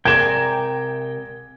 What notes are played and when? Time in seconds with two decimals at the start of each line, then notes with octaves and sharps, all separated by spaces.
0.05 C3 G#4 A#4 D5 G5 G#5 G#6 E7